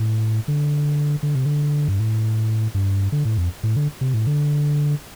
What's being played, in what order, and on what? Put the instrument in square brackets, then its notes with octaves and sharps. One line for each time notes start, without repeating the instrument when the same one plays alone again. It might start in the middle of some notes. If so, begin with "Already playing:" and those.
Already playing: [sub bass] A2
D3
D3
C3
D3
G2
A2
G2
D3
A2
F2
A2
D3
C3
A2
D3